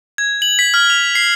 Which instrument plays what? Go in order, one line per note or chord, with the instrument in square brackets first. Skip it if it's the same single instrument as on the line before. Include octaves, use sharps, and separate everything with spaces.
[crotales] G#6
F#7
B6
F6
F7
C7